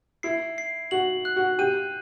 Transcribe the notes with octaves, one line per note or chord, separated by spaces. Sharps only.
E4 C7
C7
F#4 F#7
F#6
F#4
G4 D#7